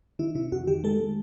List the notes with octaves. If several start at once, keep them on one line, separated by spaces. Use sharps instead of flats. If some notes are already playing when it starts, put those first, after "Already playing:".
D#3 E4
C3 E4
F2 F#4
D#3 G4
G#3 A4
G#3